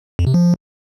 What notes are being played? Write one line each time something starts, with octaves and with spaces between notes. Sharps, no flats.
F2
C3
F3